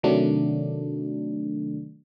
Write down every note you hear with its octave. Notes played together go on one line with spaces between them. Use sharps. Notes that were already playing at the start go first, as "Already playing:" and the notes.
C3 D#3 F#3 A3 D4